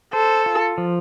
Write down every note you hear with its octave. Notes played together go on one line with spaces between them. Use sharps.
A4 C5
F4
F3